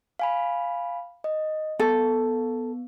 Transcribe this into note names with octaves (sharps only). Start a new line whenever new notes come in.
F5 G#5 B5
D#5
B3 A4